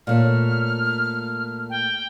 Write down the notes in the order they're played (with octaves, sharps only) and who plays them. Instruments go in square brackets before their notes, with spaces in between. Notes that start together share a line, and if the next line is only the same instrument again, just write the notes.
[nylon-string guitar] A#2 A3 C#5 [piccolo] F6
[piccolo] G5